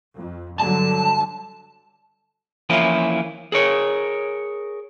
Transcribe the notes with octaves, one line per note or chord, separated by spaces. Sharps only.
F2
G2 D3 F#3 A5
E3 F3 A#3 C#4 E4 F4
G#4 A#4 C#5